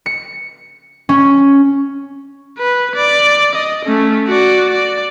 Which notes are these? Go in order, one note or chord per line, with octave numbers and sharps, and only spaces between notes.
C#7
C#4
B4
D5
D#5
A3 C#4
F#4 D5
D5